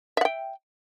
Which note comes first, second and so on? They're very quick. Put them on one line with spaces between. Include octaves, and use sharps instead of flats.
E5 F#5 G5